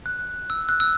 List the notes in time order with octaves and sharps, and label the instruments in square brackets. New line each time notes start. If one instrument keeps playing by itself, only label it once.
[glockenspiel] F#6
E6
F#6
E6